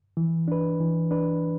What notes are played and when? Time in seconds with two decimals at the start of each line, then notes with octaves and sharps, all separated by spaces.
0.17 E3
0.48 D4 B4
0.80 E3
1.11 D4 B4